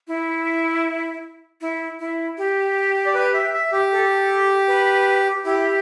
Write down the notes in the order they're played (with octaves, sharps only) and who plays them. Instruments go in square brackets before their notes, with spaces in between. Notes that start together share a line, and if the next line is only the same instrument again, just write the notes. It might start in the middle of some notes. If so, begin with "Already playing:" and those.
[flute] E4
E4
E4
G4
[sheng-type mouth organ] D5
B4
E5
E5
G4
[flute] A4
B4
[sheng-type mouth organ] E4 [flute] G4